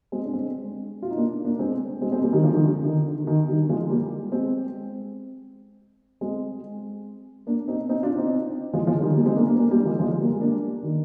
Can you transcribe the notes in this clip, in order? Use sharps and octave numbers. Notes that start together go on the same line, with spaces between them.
G#3 C4
D4
G#3 C4
F4
D#4
A#3 D4
A#3 D4
G#3 C4
G#3 C4
G#3 C4
G3 A#3
D#3 G3
D3 F3
D#3
D3
D#3
D3
D#3
D#3 G3
F3 G#3
G3 A#3
G#3 C4
G#3 C4
A#3 D4
C4 D#4
C4 D#4
D4 F4
C4 D#4
F3 G#3
F3 G#3
D#3 G3
G3 A#3
G#3 C4
A#3 D4
A#3 D4
A#3 D4
G3 A#3
F3 G#3
F3 G#3
G3 A#3
A#3 D4
D#3